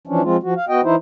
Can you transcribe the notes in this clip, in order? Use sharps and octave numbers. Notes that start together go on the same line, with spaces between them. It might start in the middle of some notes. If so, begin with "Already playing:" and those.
E3 F3 C#4 D4
F3 G#3 C4 F4
F3 F#4
F5
B3 F#4 D#5 G5
E3 D#4 E4 C5